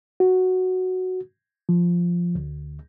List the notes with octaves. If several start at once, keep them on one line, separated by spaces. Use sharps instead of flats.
F#4
F3
D2